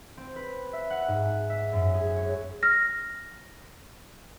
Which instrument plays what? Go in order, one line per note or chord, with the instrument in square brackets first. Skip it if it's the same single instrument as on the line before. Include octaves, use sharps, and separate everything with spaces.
[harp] C4
B4
E5
F#5
G#2
E5
F#2
G#4
C#5
[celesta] F6 A#6